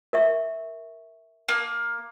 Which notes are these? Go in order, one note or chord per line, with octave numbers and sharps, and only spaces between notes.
A#4 E5 C#6
A#3